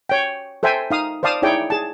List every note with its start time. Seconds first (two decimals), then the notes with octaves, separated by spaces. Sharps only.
0.09 C#5 G5
0.63 A4 C5 E5 G5 G#5
0.91 D#4 F5 D#6
1.23 C5 D5 F5 A5 D#6
1.42 D#4 E4 G#4 C#5 D5 G5
1.70 G#4 A5